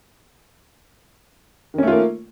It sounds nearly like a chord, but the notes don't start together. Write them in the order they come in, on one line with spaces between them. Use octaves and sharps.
D#3 C#4 A3 F4 A#3